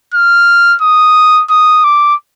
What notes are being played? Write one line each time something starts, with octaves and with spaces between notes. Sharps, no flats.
F6
D#6
D#6
D6